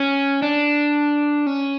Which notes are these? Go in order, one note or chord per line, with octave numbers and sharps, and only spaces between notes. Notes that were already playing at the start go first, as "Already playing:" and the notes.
Already playing: C#4
D4
C#4